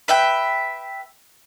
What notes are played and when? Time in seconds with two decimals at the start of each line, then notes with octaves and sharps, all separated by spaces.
0.08 B4 E5 G5